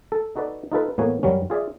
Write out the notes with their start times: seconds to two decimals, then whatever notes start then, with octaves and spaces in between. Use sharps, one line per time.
0.12 A4
0.36 D#4 F#4 A4 B4 D5
0.72 D#4 F4 A4 B4
0.98 A2 E3 A#3 B3 F#4 G#5
1.23 F#2 F#3 G3 C#4
1.50 F4 G#4 D5 E5